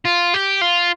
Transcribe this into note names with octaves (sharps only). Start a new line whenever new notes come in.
F4
G4
F4